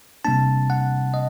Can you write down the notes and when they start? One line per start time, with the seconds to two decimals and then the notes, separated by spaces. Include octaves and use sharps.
0.25 C3 G3 A#3 D4 A5
0.70 F#5
1.14 D#5